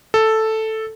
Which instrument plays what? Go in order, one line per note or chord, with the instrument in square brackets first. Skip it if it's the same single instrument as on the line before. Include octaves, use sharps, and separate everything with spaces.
[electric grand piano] A4